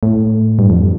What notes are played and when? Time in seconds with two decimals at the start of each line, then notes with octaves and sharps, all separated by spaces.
0.03 A2
0.59 G2
0.70 F2